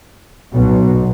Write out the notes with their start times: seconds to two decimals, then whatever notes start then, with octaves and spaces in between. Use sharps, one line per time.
0.54 B1 B2